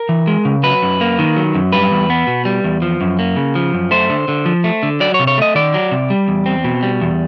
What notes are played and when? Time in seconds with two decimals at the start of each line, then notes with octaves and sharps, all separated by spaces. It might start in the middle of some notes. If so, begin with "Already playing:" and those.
Already playing: A#4
0.09 E3
0.27 G#3
0.45 C#3
0.63 F#3 B4
0.82 F#2
1.01 A#3
1.19 D#3
1.36 F#3
1.55 F#2
1.73 G3 B4
1.91 E2
2.10 B3
2.27 B2
2.45 G3
2.64 E2
2.82 F3
3.01 F#2
3.19 A#3
3.36 C#3
3.55 F3
3.74 F#2
3.91 A3 C5
4.10 D3
4.28 D3
4.46 F3
4.64 A3
4.83 D3
5.00 F#3 D5
5.14 C#5
5.19 C3
5.27 C#5
5.38 A3 D#5
5.55 D#3 D5
5.74 F#3
5.91 C3
6.10 G3
6.28 E2
6.46 C4
6.64 B2
6.83 G3
7.02 E2